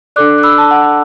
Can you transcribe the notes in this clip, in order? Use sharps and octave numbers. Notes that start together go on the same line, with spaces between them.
D4 A4 D5 D6 F#6
F#6
B5 E6
A5
F#5